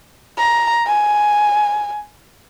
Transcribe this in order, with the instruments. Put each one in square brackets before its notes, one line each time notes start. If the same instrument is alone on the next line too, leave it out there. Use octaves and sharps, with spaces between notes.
[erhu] A#5
G#5